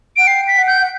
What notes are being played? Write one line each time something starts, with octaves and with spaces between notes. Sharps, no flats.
F#5 D7
G5 C7
B6
F#5
G6
F#5